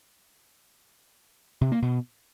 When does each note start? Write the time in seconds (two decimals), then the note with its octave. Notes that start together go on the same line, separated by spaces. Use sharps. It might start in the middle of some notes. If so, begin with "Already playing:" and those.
1.61 C3
1.72 A#3
1.82 B2